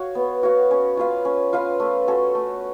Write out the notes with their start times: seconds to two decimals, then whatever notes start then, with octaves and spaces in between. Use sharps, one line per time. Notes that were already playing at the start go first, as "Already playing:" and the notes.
Already playing: F#4 C#5 F5
0.15 B3
0.43 F#4 C#5 F5
0.71 C#4
0.97 F4 B4 F5
1.25 C#4
1.53 F4 B4 F5
1.80 A3
2.07 C#4 F#4 A4
2.35 A3